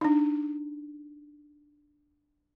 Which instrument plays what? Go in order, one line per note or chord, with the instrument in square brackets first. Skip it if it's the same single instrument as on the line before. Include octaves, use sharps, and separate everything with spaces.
[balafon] D4 D#4